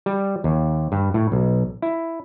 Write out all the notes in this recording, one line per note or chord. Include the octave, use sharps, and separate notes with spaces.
G3
D#2
G2
A2
B1
E4